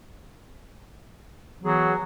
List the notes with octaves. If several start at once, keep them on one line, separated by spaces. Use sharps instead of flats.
E3 F#3 B3 G#4